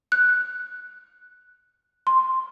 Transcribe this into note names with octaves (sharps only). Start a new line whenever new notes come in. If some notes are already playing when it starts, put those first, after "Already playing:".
F#6
C6